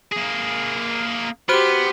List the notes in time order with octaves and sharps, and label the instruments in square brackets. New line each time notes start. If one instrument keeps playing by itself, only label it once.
[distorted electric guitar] A#3 G#4
[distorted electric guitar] B3 [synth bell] F#4 C5 F#6 [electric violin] G4 C6